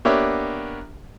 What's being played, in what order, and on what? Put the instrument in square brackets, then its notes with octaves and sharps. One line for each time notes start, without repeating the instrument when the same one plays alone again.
[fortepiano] A#3 B3 D4 G4 C#5 E5